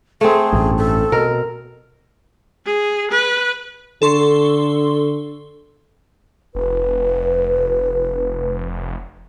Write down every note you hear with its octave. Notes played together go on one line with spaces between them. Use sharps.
A3 C4 G#4
A1 G2
A4
B2 A#4
G#4
B4
D3 A4 C6 C#6
F1 B4